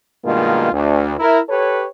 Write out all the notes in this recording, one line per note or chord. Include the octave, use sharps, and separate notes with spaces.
G2 B2 D#3 G#3 A#3 F4
D2
E4 A#4
G4 A4 B4 C#5